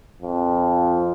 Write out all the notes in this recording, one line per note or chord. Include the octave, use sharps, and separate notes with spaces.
F2